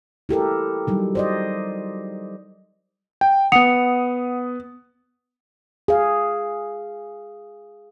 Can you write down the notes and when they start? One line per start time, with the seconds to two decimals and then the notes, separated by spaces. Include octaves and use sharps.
0.29 E4 G4 A4 A#4
0.87 F#3 G3 D#4
1.15 C5 D5 D#5
3.21 G5
3.52 B3 F#5 D#6 C#7 F7
5.88 G#4 F5